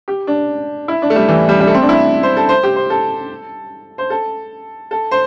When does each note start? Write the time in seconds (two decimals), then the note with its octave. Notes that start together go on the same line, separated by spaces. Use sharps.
0.08 G4
0.27 D4
0.88 E4
1.02 D4
1.10 A3
1.16 G3
1.28 E3
1.49 G3
1.60 G3
1.67 A3
1.74 C4
1.82 D4
1.89 E4
2.23 C5
2.37 A4
2.49 C5
2.63 G4
2.76 C5
2.90 A4
3.98 C5
4.10 A4
4.91 A4
5.11 C5